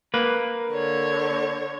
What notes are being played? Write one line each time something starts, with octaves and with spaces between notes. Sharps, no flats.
A#3 B4
D3 C#5